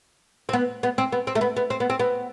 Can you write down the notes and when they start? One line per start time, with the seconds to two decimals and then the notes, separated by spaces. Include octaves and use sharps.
0.49 C4
0.53 B3
0.83 B3
0.98 C4
1.12 B3
1.27 C4
1.35 A3
1.41 B3
1.56 B3
1.70 C4
1.80 B3
1.90 C4
1.99 B3